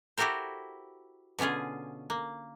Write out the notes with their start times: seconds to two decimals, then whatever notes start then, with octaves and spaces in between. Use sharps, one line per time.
0.17 E4 F#4 G4 A4 A#4 C5
1.39 B2 D3 C#4 F4 G#4
2.10 A#3